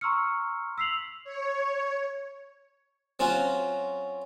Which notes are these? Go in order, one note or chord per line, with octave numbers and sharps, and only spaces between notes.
A#5 C6 C#6 E6 F6 C#7
E6 B6 C7 F7 F#7
C#5
F#3 C4 C#4 F4 F#4